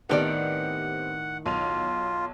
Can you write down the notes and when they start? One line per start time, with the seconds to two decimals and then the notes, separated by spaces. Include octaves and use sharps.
0.09 A2 D#3 B3 C4 G4 D5 F#5
1.46 B1 F4 D#7 F7